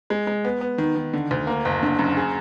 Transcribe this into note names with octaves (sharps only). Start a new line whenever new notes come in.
G#3
G#3
B3
B3
D#3
D#3
D3
D2
A#3
F#1
D3
F#2
G#4